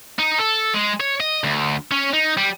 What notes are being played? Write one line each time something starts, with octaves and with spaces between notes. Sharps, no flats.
D#4
A4
G#3
C#5
D#5
D2
C#4
D#4
G3